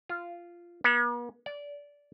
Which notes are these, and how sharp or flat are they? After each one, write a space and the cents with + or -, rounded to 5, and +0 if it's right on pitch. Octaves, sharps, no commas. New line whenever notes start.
F4 -10
B3 -45
D5 -20